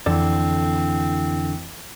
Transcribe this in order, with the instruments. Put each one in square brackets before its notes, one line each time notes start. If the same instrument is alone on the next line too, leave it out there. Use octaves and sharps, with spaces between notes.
[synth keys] F2 E3 E4 [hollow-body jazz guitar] D3 A4 D5 [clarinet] C4